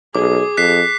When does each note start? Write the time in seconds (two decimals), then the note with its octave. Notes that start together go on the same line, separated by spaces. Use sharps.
0.15 B1 G#4 D6
0.57 F2 F#6 B6 C7